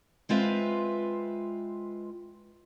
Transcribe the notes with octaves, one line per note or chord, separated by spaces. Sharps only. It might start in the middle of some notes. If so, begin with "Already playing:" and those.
G#3 C4 F4 B4 E5